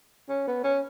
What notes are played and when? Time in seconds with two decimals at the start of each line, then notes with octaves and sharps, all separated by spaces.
0.29 C#4
0.48 B3
0.64 C#4